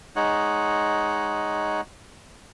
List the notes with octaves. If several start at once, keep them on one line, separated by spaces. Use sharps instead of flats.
G#3 D#4 C#5 F#5